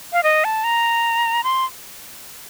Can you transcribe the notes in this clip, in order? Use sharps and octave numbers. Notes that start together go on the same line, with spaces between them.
F5
D#5
A5
A#5
C6